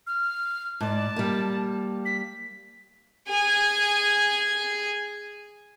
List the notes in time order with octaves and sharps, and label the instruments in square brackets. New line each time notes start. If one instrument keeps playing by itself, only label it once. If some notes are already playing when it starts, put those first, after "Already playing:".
[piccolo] F6
[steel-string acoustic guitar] G#2 D5 [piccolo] A5
[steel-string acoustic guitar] G3 A#3
[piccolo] B6
[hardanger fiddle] G#4 G#5